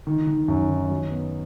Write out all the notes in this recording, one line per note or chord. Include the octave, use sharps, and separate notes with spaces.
D#3
D#3
F#2
D#3
F#3
B3